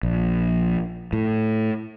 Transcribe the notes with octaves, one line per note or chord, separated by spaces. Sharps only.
A#1
A2